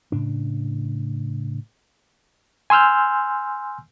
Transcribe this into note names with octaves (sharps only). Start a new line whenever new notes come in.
A2 C#3 D4
G#5 C6 E6 F6 G6